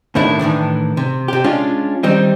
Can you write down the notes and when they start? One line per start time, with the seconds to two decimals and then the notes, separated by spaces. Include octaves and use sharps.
0.15 D#2 A2 D#3 D4 E4
0.39 A2 D#3 E3 D4
0.97 C3
1.28 C3 G4
1.44 G#3 C#4 D4 F4
2.03 D#3 G3 C4 D#4